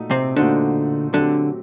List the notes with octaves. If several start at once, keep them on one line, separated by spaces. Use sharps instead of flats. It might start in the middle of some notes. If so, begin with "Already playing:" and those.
Already playing: A#2 A3 D#4 F#4
C3 C4
A#2 D3 A3 D4 D#4 F#4 C5
D3 F#3 A3 C4 D4 G4